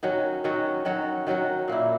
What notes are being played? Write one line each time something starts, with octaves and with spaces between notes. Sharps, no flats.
D#3 F#3 C#4 F#4
D#3 F#3 C#4 F#4
D#3 F#3 C#4 F#4
D#3 F#3 C#4 F#4
A#2 A#3 E4